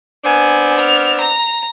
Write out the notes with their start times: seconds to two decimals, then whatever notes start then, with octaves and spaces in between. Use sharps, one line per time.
0.24 B3 C4 D4 G#5
0.79 F6
1.21 A#5